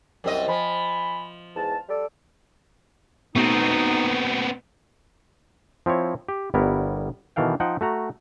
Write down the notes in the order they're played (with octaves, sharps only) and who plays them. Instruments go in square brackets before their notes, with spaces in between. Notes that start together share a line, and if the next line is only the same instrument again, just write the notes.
[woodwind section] C2 [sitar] F#2 C4 D#5
[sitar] F3 [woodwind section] G#5 B5
[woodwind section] E2 G#2 A5
G3 A4 D5
[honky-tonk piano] B2 A3 F#4 [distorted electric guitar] B3 C4 [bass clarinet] D#4
[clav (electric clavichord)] F3 C4 E4 C#5
G4
G1 G3 B3 E4 A#4 C#5
B2 D#3 E3 A4 F5 G5
F3 D#4 C5 F#5 G5
A3 F#4 A#5